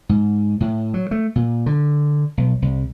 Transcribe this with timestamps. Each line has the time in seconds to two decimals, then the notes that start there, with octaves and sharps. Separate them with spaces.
0.09 G#2
0.60 A2
0.94 F#3
1.11 A3
1.36 A#2
1.66 D3
2.37 B1
2.62 C2